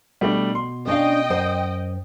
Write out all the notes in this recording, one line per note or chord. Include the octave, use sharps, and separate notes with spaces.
B2 G3 A3 D4
C6
C#4 D4 D#5 F5 G5
F#2 C5